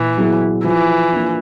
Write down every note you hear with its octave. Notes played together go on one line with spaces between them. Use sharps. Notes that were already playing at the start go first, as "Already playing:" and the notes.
Already playing: A#2 E3
F#3 B3 E4 G#4
E3 F3
A#3 D4